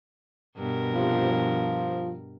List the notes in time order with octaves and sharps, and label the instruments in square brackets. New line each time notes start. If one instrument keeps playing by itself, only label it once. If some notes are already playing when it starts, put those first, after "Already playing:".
[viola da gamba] G2 B2 A#4
[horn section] C3 F3
F3